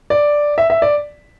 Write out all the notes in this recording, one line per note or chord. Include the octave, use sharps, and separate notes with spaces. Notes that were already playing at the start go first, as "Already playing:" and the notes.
D5
E5
E5
D5